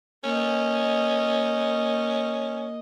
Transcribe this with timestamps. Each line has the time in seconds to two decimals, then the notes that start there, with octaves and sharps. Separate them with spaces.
0.24 A#3 C#4 D#5